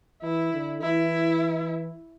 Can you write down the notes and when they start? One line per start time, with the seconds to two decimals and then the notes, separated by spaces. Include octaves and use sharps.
0.23 E3 E4
0.53 D3
0.82 E3 E4